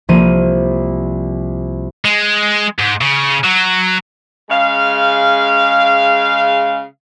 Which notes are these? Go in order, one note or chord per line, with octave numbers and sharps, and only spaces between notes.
C2 F3 A#3 D#7
G#3
G#2
C#3
F#3
C#3 G#3 F5